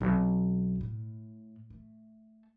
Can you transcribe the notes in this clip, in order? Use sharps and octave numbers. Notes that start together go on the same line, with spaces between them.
B1 C4
A2
A3